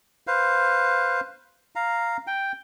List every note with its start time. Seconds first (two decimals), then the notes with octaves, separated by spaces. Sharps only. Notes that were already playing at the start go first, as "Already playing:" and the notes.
0.27 B4 C5 F5
1.76 F5 A#5
2.27 G5